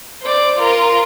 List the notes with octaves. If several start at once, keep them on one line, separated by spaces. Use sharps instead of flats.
C5 D5
F4 A#4